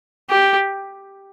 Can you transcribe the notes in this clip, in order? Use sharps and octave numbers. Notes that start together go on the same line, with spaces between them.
G4